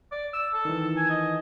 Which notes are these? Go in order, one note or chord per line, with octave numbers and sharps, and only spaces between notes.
D5
E6
A4
D#3 E3
G#5
D#5